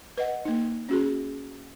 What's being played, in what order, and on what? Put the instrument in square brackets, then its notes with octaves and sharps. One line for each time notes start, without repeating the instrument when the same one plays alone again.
[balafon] B4 D#5 F#5
A#3 D#4
C#4 F#4 G#4